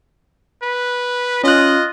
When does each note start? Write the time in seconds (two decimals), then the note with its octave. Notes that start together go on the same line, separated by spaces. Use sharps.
0.62 B4
1.44 C#4 F4 D#5 F#6